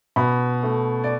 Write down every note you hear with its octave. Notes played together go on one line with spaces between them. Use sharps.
B2 B5
A3
D5